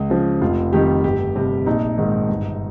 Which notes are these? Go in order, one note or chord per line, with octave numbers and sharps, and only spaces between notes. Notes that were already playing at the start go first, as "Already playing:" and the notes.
Already playing: C#2
C#3 F3
F1 F4
F2 D#3 G3 G4
G1 G4
F2 C3 G3
A#1 D#4
G#2 D#3
G1